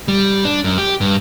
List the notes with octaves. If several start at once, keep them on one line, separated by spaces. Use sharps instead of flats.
G3
D4
F#2
G4
G2